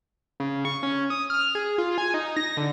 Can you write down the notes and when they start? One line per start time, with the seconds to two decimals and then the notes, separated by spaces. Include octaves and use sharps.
0.40 C#3
0.65 C#6
0.83 C#4
1.10 D#6
1.30 F6
1.55 G#4
1.78 F4
1.98 G#5
2.14 D#4
2.37 A#6
2.57 D3